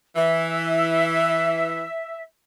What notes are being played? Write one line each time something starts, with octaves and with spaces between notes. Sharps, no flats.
E3 E5